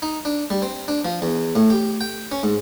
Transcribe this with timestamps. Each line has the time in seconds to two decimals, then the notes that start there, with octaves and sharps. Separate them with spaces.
0.02 D#4
0.25 D4
0.50 G3
0.62 C4
0.88 D4
1.05 F3
1.22 E2
1.55 A2
1.70 G4
2.01 G5
2.32 C#4
2.43 G#2